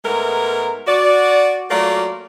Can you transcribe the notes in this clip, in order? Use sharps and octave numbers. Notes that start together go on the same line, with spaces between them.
G#2 G#3 A3 B3 A#4
F#4 D5
F#3 A3 A#3 F4 A#4 D5